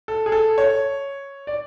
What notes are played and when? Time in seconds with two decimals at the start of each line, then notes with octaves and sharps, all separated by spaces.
0.08 A4
0.26 G#4
0.32 A4
0.58 C#5
1.47 D5